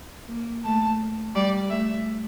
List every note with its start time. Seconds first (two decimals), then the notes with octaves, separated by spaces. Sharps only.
0.28 A#3
0.64 A3 A5
1.35 G3 D5
1.70 A3 E5